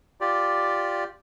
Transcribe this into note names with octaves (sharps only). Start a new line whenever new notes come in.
F4 G4 D5